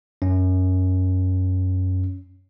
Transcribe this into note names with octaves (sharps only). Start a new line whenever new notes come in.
F#2 C#4